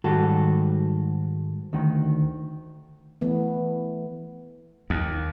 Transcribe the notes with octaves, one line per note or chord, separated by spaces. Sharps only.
G#2 D#3 G3 F#4 A4
D2 D#3
E3 A3 B3
D#2